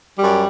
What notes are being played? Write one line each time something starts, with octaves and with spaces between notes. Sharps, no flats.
F#2 G3